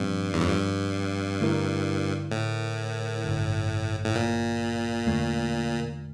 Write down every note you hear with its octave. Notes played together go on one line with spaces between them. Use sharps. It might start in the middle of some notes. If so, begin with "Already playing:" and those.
Already playing: G2 A#2 F3 C4
E2
F2
G2
D3 A3 E4 A#4
A2
A1 G2 D3
A2
A#2
E2 D3 A3